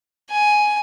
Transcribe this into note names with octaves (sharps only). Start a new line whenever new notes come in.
G#5